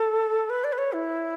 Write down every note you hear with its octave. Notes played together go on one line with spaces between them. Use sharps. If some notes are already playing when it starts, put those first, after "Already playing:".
Already playing: A4
B4
D5
B4
C#5
E4